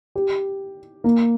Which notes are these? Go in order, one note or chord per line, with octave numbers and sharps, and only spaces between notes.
G4
A#3